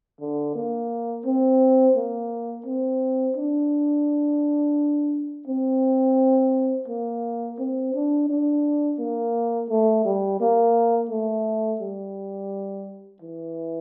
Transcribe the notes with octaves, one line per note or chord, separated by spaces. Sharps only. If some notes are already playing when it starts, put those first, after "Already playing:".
D3
A#3
C4
A#3
C4
D4
C4
A#3
C4
D4
D4
A#3
A3
G3
A#3
A3
G3
E3